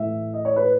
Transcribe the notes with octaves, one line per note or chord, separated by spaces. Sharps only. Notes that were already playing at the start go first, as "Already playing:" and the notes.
Already playing: A2 E3 A3 E5
D#5
C#5
B4